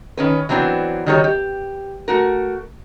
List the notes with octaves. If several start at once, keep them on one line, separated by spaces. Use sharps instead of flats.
D#3 C#4 B4
E3 F#3 B3 C4 D4
D#3 F#3 G3 D#4 B4 C#5
G4
A3 F#4 A#4